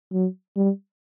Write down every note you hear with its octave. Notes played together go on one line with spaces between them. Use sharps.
F#3
G3